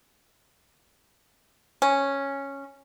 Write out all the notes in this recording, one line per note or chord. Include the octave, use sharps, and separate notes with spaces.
C#4